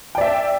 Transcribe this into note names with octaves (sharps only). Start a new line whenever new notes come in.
D5 E5 G5